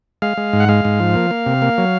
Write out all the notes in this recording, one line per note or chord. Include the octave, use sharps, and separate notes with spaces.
G#3 F5
G#3
G#2
F#5
G#3 F5
G#2
F3
A#3
A#3
C3
A#3
F#3